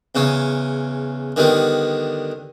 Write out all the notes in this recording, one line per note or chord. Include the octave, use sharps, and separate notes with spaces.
E2 C#3 C#4
D3 D#3 G3 B3